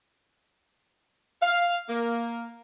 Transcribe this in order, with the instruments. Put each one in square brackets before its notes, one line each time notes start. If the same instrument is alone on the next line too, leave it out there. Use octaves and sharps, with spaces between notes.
[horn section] F5
A#3